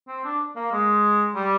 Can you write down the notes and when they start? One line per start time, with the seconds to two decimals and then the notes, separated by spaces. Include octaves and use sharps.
0.08 C4
0.25 D4
0.56 A#3
0.72 G#3
1.35 G3